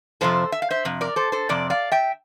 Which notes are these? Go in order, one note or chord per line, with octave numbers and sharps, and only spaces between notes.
F2 C3 F3 A4 C5
E5
F5
C5 E5
F2 C3
A#4 D5
A4 C5
A4 C5
F2 C3 D5
D5 F5
E5 G5